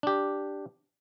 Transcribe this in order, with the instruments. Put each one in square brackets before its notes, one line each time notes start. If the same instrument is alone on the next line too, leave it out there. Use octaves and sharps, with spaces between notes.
[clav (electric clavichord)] D4 G4